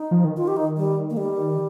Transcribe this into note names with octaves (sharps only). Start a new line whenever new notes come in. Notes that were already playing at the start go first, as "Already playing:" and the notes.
Already playing: D#4
F3
D#3
D#3 F4
G4
D#4
G3
A#3
D#3 G3